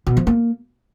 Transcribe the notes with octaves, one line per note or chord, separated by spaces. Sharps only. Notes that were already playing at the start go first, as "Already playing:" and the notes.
B2
F3
A#3